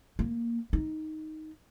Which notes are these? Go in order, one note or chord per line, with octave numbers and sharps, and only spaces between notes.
A#3
D#4